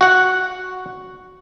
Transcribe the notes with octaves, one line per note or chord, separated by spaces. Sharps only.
F#4 F#5